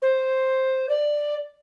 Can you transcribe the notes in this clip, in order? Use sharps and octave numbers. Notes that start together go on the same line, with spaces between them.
C5
D5